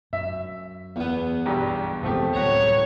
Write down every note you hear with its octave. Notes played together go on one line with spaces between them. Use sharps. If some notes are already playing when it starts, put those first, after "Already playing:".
F#2 E5
E2 B3
B1 G2 G4
E1 C#2 F3 A3 C4 G4
D1 C2 C#5 F#5 A#5